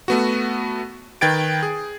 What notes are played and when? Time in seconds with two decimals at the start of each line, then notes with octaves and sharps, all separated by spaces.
0.08 A3 B3 F#4
1.21 D#3 B4 G5 G#6 A6 D7
1.63 G#4